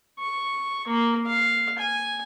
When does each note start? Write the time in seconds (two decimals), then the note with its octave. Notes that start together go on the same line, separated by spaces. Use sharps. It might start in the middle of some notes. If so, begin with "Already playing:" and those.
0.20 C#6
0.87 A#3
1.27 F5
1.78 G#5